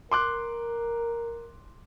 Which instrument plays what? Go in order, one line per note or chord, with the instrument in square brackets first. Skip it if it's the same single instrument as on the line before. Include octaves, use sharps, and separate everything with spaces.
[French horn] A#4 [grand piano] C6 D6 F#6